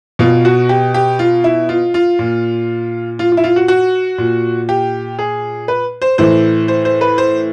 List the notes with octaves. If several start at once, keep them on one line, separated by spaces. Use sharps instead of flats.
B2 F4
F#4
G4
G4
F4
E4
F4
F4
A#2
F4
F4
E4
F4
F#4
F#4
A#2
G4
G#4
B4
C5
A2 E3 C5
C5
C5
B4
C5